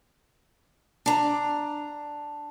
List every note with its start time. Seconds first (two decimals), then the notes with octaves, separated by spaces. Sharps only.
1.06 D4 A#5